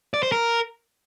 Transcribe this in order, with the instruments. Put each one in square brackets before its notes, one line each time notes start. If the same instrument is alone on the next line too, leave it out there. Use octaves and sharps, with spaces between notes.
[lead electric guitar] D5
C5
A#4